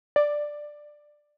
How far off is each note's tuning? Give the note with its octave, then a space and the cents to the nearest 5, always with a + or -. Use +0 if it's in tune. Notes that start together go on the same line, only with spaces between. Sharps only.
D5 +10